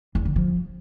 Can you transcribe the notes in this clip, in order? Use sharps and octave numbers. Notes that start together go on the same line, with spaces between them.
E2
D3
F3